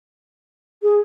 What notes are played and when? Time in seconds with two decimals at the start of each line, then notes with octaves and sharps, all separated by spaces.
0.82 G#4